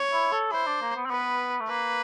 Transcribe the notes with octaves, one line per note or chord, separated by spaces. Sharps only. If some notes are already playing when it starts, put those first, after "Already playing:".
Already playing: C#5
E4
A4
E4 C5
D4
A#3
B3
C4
B3 B4
A3
A#3 B4